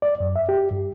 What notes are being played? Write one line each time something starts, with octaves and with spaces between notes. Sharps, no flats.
D5
F#2
E5
G4
G2